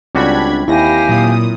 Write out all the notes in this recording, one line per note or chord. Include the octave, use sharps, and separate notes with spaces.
C#2 G3 C4 D4 F#4 B5 G#6
D#2 E4 G4 F5 G#5 A#6
A#2 F#3 D#6